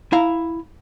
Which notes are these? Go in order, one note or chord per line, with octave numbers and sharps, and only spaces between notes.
E4 F5 A#5